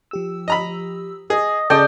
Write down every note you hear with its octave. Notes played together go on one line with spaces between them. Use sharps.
F3 G4 E6
D#5 A#5 B5
G#4 D#5
C#3 C#4 G#4 A4 D5 D#5 G5 D#6